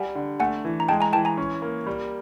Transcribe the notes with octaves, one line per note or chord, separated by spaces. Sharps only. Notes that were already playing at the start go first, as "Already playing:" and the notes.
Already playing: G3 F#5 G#5
D3
A3 F#5 G#5
E3
A#5
G#3 G5 A5
G#5 A#5
E3 G5 A5
G#5 A#5
C#4
A#3
G3